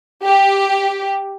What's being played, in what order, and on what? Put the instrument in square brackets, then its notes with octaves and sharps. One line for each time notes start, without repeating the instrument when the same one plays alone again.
[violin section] G4